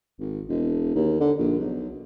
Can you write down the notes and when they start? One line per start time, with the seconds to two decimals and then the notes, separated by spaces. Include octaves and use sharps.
0.20 G#1
0.49 E1
0.95 D#2
1.20 D3
1.39 A#1
1.59 B1